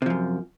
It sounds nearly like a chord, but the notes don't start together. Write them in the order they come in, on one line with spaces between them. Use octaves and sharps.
C3 F3 F#2